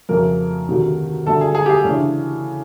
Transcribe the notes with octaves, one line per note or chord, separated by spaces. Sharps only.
F2 C#3 F#3 A3 A#4
D2 C3 D#3 F#3
G2 D3 F#3 A3 A4
G#4
G#4
G4
G#4
C#3 E3 A3 D4